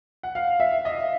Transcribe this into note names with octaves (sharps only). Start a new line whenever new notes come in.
F#5
F5
E5
D#5